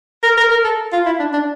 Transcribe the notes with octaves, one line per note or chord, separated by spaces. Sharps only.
A#4
A#4
A#4
A4
F4
E4
D4
D4